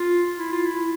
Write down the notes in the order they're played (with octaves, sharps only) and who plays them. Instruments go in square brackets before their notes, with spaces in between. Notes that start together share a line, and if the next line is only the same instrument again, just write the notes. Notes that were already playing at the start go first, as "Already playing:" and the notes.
Already playing: [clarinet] F4
E4
F4
E4